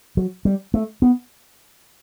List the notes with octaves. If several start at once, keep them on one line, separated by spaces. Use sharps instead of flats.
F#3
G3
A3
B3